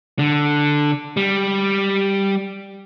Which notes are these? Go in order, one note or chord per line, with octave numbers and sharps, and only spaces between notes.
D3
G3